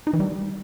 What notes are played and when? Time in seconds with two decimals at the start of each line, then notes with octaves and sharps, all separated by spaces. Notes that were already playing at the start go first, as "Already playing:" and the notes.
0.07 D#4
0.13 E3
0.20 G3